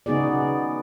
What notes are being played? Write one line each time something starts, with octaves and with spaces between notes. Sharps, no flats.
C#3 B3 D#4 F#4 G#4 D5